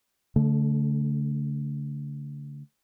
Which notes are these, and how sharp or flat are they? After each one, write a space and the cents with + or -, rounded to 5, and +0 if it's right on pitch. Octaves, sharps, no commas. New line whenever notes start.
D3 -40 A3 +0